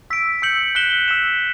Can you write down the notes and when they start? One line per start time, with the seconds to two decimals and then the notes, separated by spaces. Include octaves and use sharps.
0.10 E6 B6 D7
0.42 E6 G6 C#7 F#7
0.75 F#6 B6 E7 G7
1.08 E6 B6 E7